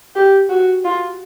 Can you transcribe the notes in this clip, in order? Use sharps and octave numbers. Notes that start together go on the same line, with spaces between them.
G4
F#4
F4